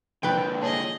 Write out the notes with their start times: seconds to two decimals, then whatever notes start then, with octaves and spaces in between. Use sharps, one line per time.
0.23 A#1 F2 A#2 D3 F3 B4 G5
0.62 A#2 G#4 C#5 D#5 A5